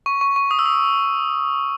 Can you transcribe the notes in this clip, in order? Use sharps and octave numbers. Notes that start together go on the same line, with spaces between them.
C#6
C#6
C#6
D#6
E6
D#6